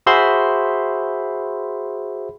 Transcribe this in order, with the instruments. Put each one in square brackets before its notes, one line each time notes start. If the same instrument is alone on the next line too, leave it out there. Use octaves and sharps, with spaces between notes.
[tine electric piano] F#4 G#4 C5 E5 B5 C6